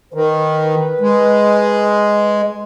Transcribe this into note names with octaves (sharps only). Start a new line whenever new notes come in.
D#3 B4
G#3